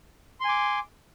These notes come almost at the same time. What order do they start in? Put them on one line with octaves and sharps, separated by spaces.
C6 G#5 D6